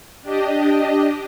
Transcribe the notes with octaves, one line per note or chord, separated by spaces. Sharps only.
D4 G4 D#5